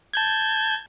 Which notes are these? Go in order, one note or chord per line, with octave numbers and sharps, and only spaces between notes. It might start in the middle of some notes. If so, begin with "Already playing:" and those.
A5 G6 G#6